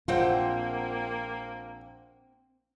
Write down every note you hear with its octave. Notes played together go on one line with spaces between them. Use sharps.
A#1 A#3 C4 F4 C5 F#5 G5